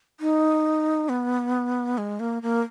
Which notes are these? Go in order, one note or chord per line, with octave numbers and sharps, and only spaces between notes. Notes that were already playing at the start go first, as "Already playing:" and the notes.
D#4
B3
G#3
A#3
A#3